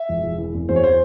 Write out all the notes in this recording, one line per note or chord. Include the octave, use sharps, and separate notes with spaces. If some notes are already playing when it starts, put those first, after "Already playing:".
Already playing: E5
E1
E1
E3
E2
E2 C5
C#5
C5